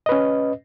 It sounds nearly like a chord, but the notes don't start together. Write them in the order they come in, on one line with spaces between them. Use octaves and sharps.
D#5 B4 C#4